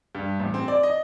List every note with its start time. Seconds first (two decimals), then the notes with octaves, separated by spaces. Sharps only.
0.15 G2
0.39 A1
0.54 C4
0.68 D5
0.83 D#5